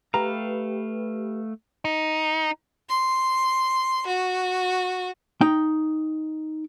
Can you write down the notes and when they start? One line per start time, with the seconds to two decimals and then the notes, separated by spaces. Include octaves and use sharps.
0.14 A3 G4 B4 F5 A#5
1.85 D#4
2.89 C6
4.07 F#4
5.41 D#4 G5